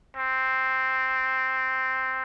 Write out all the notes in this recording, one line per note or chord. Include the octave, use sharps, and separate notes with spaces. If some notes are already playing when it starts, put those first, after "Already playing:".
C4